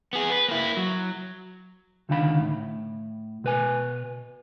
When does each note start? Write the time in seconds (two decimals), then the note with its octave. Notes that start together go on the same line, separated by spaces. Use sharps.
0.13 B3 G#4
0.32 B4
0.48 A#3 E4
0.77 F#3
2.09 C#2 D3 D#3 F5 B5
2.40 A2
3.44 B2 B4 G#5